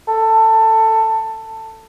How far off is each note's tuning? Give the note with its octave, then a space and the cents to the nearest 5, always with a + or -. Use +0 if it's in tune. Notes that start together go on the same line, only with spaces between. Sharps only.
A4 +15